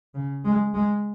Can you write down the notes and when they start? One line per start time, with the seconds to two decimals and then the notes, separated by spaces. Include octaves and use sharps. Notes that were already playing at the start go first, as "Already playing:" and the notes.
0.14 C#3
0.44 G#3
0.74 G#3